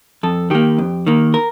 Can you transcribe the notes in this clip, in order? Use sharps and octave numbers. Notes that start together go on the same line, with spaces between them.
F2 A4
D#3 A#3 G4
F2
D#3 A#3
A#4